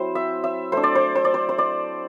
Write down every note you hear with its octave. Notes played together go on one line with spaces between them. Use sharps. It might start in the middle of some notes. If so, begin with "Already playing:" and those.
Already playing: F#3 C4 E4 C5
E5
E5
A3 D4 C5
D5
C5
C5
D5
C5
C5
D5